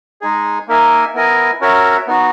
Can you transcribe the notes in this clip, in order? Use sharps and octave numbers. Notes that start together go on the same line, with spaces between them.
G#3 D#4 G#4
A#3 D#4 A#4 E5 G#5
B3 E4 A#4 D#5 G#5
C#4 F#4 A#4 C#5 E5
B3 D#4 F#4